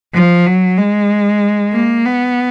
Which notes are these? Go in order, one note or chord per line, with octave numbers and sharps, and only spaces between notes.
F3
F#3
G#3
A#3
B3